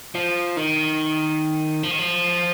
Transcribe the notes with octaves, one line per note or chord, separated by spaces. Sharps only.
F3
D#3
F3
D#3
F3